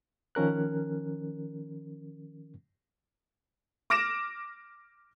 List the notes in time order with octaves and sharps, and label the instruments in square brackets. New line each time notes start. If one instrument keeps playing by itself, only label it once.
[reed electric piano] D#3 F3 C#4 A#4 F#6
[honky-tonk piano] D6 F6 A#6 D7 E7